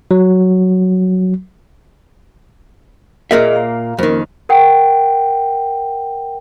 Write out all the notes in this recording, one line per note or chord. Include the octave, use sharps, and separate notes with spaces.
F#3
A#2 A#3 G#4 D#5 E5
F5 A#5
F2 D#3 A#3 C#4 A#4
A#4 F#5 G5